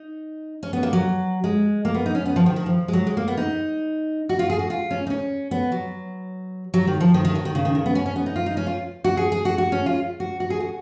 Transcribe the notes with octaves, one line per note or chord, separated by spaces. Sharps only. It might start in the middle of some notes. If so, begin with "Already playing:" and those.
Already playing: D#4
C#4
B3
A#3
F#3
G#3
A#3
B3
D#4
C#4
B3
F3
D#3
D#3
F3
G#3
F#3
G#3
A#3
B3
D#4
F#4
F4
G#4
F#4
F4
C#4
D#4
C#4
B3
F#3
F#3
D#3
F3
D#3
D#3
F#3
D#3
C#3
D#3
C#3
B3
C#4
C#4
B3
D#4
F4
D#4
C#4
F4
F#4
G#4
G#4
F#4
F#4
C#4
F4
F#4
F#4
G#4
F#4